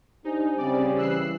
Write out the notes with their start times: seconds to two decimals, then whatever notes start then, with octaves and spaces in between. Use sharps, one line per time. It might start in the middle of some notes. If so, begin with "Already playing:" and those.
0.24 D4 D#4 G4 C5 G#5
0.58 C#3 G3 C4 D5
0.98 E3 E6 F#6 C7